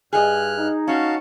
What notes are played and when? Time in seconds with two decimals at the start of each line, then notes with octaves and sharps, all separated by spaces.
0.13 G2 G#4 D#5 F6 F#6
0.57 D#4
0.88 C#4 F#4 F5 A5